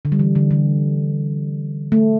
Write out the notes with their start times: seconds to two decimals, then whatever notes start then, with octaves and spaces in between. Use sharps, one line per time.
0.05 D3
0.12 G3
0.19 E3
0.35 D3
0.51 D3
1.92 A3